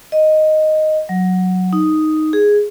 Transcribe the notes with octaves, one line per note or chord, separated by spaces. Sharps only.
D#5
F#3
D#4
G#4